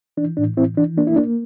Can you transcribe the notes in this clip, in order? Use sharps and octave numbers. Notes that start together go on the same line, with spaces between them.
E3 D4
A2 D4
E3 C4 E4
E3 D4
A#3 D4
E4
A#3 D4